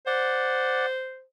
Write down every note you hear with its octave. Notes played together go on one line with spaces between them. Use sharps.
C5 D5 F#5